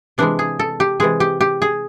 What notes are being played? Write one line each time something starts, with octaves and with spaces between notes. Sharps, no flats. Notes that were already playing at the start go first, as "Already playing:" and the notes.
C3 E3 G#3 D4
G#4
A4
G4
C3 E3 G#3 G#4
G4
G4
G#4